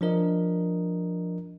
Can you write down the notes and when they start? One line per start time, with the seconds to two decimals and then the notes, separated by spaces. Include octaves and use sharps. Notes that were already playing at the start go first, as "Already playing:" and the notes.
0.01 F3 D4 A#4 D#5